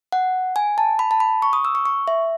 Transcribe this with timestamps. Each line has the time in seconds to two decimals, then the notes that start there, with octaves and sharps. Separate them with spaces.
0.12 F#5
0.56 G#5
0.78 A5
0.99 B5
1.11 A5
1.20 B5
1.42 C#6
1.53 D#6
1.65 E6
1.75 C#6
1.86 C#6
2.08 E5